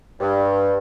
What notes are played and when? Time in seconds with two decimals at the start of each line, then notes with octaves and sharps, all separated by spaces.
0.20 G2